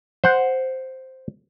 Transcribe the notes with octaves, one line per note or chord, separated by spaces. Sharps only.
C5 F#5